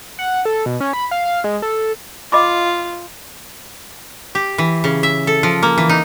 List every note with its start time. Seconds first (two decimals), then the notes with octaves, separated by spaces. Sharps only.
0.19 F#5
0.45 A4
0.66 B2
0.80 C#4
0.93 B5
1.11 F5
1.25 F5
1.44 G#3
1.62 A4
2.32 F4 D#5 B5 D6
4.35 G4
4.58 E3
4.84 C#3
5.03 E5
5.27 A4
5.43 F3
5.63 A#3
5.78 E3
5.89 D#4